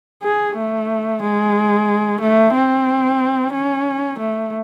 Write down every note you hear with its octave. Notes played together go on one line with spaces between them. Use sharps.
G#4
A3
G#3
A3
C4
C#4
A3